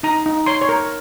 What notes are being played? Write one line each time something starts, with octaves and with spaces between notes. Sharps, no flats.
D#4 A#5
D#4
C#5 C6
C#5
A#4